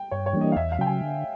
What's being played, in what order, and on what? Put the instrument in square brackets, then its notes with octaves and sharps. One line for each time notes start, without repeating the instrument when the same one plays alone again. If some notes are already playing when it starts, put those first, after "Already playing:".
Already playing: [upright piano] G5
[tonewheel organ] G2 [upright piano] C#5
[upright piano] C#5
[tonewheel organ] E3 G3 A#3 D4
[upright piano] D#5
F5
[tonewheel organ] E2 [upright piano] E5
[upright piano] F5
[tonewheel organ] C#3 F#3 [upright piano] G5
[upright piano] G#5
[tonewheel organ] D3